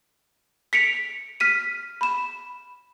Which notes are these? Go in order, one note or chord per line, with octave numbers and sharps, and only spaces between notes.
B6 C#7 D7 F7
F6 B6 D#7
B5 E7